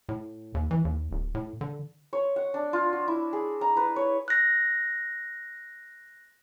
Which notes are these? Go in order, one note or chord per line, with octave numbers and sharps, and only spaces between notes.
A2
D#2
E3
D#2
D1
A2
D3
C#5
F#5
D4
F4
F#4
E4
G#4
A#5
B4
C#5
F#6 A#6